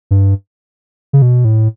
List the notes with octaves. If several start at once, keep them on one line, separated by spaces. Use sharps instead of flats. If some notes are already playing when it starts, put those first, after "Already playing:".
G2
C#3
B2
A2